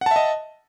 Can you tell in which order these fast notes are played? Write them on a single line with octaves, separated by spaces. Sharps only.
F#5 A5 E5 D#5